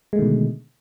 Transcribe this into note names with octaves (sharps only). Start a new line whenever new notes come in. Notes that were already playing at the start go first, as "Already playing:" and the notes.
B2 D3 D#3 G#3 A3